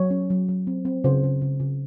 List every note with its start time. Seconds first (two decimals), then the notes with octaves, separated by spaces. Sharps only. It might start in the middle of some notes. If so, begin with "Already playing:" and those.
Already playing: F#3 C#5
0.11 C#4
0.30 F#3
0.48 F#3
0.67 C4
0.85 C4
1.04 C#3 C5
1.24 C#3
1.41 C#3
1.60 C#3